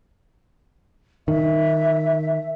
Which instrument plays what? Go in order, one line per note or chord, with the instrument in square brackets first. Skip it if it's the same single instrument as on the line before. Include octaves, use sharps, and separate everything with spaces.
[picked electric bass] D#3 [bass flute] E5